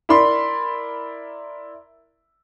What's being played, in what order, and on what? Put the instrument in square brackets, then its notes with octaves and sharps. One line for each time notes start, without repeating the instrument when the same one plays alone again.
[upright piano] E4 A#4 D5 B5 C6